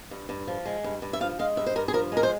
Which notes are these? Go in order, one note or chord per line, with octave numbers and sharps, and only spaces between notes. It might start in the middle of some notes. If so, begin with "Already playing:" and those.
G2
G2
F3
G#3
G2
G2
E5
F3 F5
G#3 F5
G2 E5
C5
G2 A#4
G#4
F3 A#4
G#3 A#4
C5